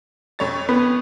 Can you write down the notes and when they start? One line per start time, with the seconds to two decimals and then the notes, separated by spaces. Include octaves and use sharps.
0.39 F2 C#5 A6
0.69 B3